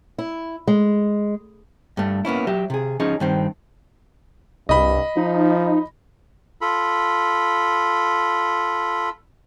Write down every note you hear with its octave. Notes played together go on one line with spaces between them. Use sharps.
E4
G#3
G2 A3
A#3 B3 C#4 E4
F#3 G4 E5
C3 G#4
F3 C#4 D#4 G#4
G2 D#3 C4
C2 G2 D#5 B5
F3 D#4
F4 A4 B5